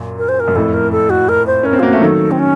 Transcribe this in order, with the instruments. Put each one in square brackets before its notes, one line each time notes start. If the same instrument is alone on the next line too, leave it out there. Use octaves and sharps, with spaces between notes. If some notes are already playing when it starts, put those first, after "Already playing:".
Already playing: [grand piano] F#2 A#2
[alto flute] A#4
C5
A#4
[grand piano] F#2
[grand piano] F2 A2 [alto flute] A4
[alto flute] A#4
A4
F#4
A#4
C5
[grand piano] C#4 [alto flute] A#4
[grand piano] C4
[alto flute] F4
[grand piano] A#3 [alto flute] F#4
[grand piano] A3
[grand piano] D#3 F#3 [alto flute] A4
[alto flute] C4
C#4